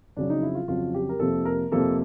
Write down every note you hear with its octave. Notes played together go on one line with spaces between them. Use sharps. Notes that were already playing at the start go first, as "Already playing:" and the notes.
F2 C#3 F#3 D4
D#4
E4
F4
F2 C#3 F#3 F4
G4
A#4
F2 C3 F3 A#3 A4
A#4
F2 C3 F3 A#3 A4